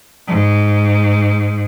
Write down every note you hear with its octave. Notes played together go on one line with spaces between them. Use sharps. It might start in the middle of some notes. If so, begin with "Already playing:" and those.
G#2